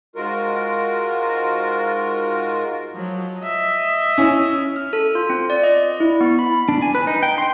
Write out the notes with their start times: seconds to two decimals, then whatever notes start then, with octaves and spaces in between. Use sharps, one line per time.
0.16 G#2 G#3 F4 F#4 A#4
2.93 F3 F#3
3.39 D#5 E5
4.18 C#4 E4
4.76 F6
4.93 A4
5.15 F4
5.30 C4
5.50 D5
5.63 D#5
6.00 E4
6.21 B3
6.39 B5
6.69 D4
6.82 G#5
6.95 B4
7.07 D#4
7.23 G5
7.38 C6